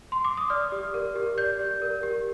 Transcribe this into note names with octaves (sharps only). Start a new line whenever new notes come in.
C6
D6
D#6
D5 F6
G4
A#4
G4
D5 G6
G4
A#4
G4